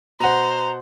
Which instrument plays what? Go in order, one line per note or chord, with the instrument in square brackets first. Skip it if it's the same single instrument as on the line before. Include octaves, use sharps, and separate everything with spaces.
[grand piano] B2 F#5 [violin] C5 [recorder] A#5